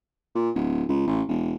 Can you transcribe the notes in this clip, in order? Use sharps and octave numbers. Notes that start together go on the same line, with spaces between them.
A#2
D1
C#2
A1
E1